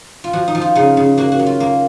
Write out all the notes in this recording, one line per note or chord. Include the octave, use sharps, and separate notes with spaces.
F4
F3 F#4
D#4
F3
F4
C#3 D#4
C#3
A#3 F#4
F#4
F#3
F4
A#3